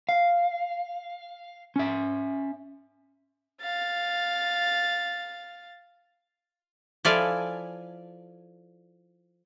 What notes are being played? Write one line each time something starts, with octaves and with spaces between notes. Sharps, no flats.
F5
C#4 E5
F5 A6
F3 E4 A4 D5 F5 G#5